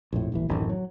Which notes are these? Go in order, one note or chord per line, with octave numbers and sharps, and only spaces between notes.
A#1 F2 A2
D#1 A1 E3
D1 A1 F#2 D#3
F#3